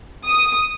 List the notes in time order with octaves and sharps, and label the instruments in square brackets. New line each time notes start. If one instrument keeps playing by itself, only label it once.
[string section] D#6